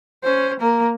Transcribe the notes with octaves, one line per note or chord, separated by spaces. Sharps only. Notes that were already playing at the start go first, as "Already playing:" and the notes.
C#4 C5
A#3 A#4